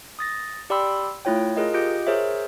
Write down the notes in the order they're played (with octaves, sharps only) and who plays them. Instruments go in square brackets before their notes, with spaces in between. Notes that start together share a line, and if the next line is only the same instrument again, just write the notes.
[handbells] D#6 A6 A#6
G4 D5 G5 B5 C6 E6
A3 E4 F4 C#5 G5
F4 G#4 A#4 D#5
F4 G4 D#5 G6 D7
G#4 A#4 C5 C#5 E5